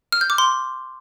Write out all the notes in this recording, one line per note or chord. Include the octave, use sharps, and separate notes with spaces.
F6
G6
D6
C6